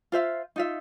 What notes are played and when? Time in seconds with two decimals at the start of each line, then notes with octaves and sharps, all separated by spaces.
0.12 F4 C5 E5 F5
0.56 D#4 F4 E5